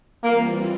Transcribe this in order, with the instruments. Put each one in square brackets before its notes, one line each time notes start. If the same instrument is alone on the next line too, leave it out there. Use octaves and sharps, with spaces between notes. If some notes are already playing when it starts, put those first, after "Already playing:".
[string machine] E3 G3 C4 F4 [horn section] A#3